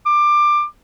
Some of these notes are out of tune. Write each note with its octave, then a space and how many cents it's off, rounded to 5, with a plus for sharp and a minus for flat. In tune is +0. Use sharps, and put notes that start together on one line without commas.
D6 +20